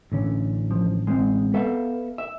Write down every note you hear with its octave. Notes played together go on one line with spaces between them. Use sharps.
A1 D3 C#4
F3
G#3 C4
B3 A4 E5 F5
E5